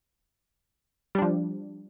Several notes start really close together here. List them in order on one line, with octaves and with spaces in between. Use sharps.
G3 D4 F3